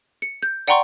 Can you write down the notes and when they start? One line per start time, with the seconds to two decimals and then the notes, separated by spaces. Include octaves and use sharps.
0.22 C#7
0.43 G6
0.68 D5 F#5 G5 A#5 C6 C#6